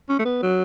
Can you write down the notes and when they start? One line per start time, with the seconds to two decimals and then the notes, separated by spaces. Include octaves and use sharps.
0.09 C#4
0.19 A3
0.25 B3
0.43 F#3